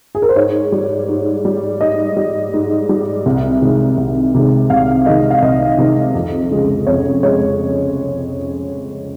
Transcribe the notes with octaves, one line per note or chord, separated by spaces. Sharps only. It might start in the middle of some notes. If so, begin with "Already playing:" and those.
G#4
A#4
C5
G#2 C#5
G3
G#2
G3
G#2 D#5
G3
G#2
G3
C2
C3 D#3 G#3
C2
C3 D#3 G#3
C2 F5
C3 D#3 G#3 D#5
F5
C2 D#5
C3 D#3 G#3
F2
C#3 G#3
F2 C#5
G#3 C#5